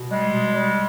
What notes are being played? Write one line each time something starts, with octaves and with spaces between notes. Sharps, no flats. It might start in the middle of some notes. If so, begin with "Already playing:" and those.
Already playing: B2
G3 G#3
B2
G3